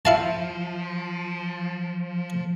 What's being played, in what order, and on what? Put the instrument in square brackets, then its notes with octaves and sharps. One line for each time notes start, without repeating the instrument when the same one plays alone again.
[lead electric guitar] F3 [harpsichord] E4 F5 A5